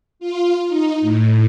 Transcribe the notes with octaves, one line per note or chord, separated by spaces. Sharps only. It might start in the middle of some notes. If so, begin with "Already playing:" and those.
F4
D#4
A2